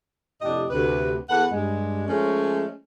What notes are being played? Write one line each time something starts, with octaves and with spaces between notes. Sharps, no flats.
F2 A2 C3 D4 G4 D#5
D2 C3 B4
E2 A4 B4 F#5
G2 G#3
F3 G#3 A3 C#4